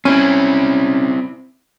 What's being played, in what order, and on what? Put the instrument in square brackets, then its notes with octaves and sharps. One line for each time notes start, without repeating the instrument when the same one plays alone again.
[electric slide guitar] C4 E4 [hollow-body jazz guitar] C#4